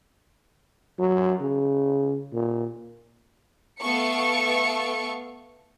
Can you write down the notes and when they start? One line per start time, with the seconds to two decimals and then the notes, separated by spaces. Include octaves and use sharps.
0.99 F#3
1.40 C#3
2.34 A#2
3.80 A3 B3 A4 F5 C#6 C#7